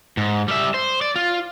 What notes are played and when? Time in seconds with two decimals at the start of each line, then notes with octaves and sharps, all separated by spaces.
0.17 G#2
0.48 G3 E5
0.74 C5
1.01 D5
1.16 F4